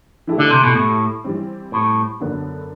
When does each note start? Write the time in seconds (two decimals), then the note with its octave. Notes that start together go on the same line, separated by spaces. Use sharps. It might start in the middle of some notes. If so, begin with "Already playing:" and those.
0.27 E3 A3 E4 G4
0.38 D3
0.51 C3
0.64 B2
0.75 A2
1.24 E3 G3 C4
1.72 A2
2.20 F#2 D3 F#3 B3 D4